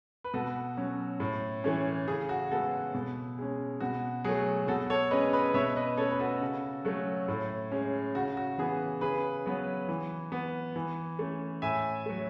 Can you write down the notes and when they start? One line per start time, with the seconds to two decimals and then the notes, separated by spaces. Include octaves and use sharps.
0.24 B4
0.34 B2 F#4 A4
0.77 F#3 C#4
1.20 A2
1.64 E3 A3 C#4
2.07 C#3 G#4
2.29 F#4
2.51 G#3 B3 F#4 A4
2.95 B2
3.38 G#3 C#4
3.80 B2 F#4
4.24 F#3 A3 G#4
4.67 B2 F#4 A4
4.90 A4 C#5
5.11 G#3 C#4 B4 D#5
5.33 B4 D#5
5.54 B2 C#5 E5
5.76 B4 D#5
5.97 C#4 A4 C#5
6.01 A3
6.11 B4
6.19 F#4 A4
6.41 C#3
6.85 F#3 A3 C#4
7.28 A2
7.72 G#3 C#4
8.15 C#3 F#4
8.37 F#4
8.58 E3 B3 G#4
9.01 C#3 G#4 B4
9.46 F#3 B3
9.89 E3
10.32 B3
10.76 E3
11.19 A3 C#4
11.62 A2 E5 G#5
12.06 F#3 A3